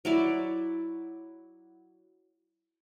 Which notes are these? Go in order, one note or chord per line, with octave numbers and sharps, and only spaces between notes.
F#3 E4 D5